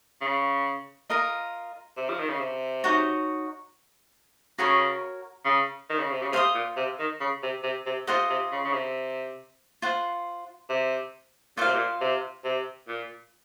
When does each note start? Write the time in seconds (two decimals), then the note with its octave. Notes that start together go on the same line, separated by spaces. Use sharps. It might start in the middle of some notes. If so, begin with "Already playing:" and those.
0.21 C#3
1.10 F4 A#4 D#5 A#5
1.97 C3
2.10 F3
2.19 D#3
2.30 C#3
2.39 C3
2.84 D#4 F#4 C#5 F#5
4.58 C#3 F#4 A#4 C#5
5.45 C#3
5.90 D#3
5.99 C#3
6.11 C3
6.22 C#3
6.32 C3 C5 F5 C6 D#6
6.55 A#2
6.77 C3
6.99 D#3
7.21 C#3
7.43 C3
7.63 C3
7.86 C3
8.07 C3 F4 C5 D#5 F#5
8.30 C3
8.52 C#3
8.65 C#3
8.74 C3
9.82 F4 C5 F#5
10.69 C3
11.57 A#2 F4 C5 F5
11.67 C3
11.75 A#2
12.01 C3
12.44 C3
12.88 A#2